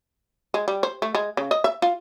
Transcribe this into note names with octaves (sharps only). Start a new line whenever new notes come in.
G#3
G3
C5
A3
G#3
C#3
D#5
E5
F4